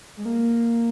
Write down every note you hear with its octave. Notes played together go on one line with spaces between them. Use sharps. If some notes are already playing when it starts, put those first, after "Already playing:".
G#3
A#3